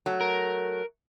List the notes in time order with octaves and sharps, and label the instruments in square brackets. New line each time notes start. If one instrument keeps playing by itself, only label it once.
[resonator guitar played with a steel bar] F#3 A3
[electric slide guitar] A#4